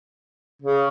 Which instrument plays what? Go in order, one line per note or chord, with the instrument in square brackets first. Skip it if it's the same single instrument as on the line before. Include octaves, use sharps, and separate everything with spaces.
[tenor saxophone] C#3